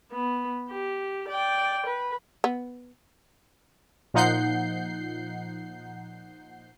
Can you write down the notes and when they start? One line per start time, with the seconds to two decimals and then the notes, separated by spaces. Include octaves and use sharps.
0.12 B3
0.69 G4
1.28 D5 G5
1.86 B4
2.44 B3
4.14 A#2 F3 D#4 F#5 G6 C7